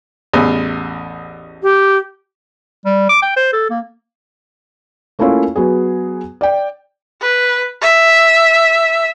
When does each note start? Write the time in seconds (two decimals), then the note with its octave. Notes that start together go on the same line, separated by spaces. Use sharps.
0.33 A1 E2
1.63 G4
2.85 G3
3.09 D6
3.22 G5
3.37 C5
3.53 A4
3.70 A#3
5.19 A3 A#3 C#4 E4 F4 C#5
5.56 F#3 B3 G#4
6.41 D5 G5
7.22 B4
7.82 E5